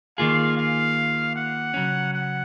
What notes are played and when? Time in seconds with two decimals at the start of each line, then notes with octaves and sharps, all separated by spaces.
0.18 D#3 A#3 F4 G#4 F5
0.58 F5
1.36 F#5
1.74 C#3 F#3 C#4
2.14 F#5